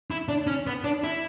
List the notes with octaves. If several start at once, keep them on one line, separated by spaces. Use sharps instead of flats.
E4
D4
C#4
B3
D4
E4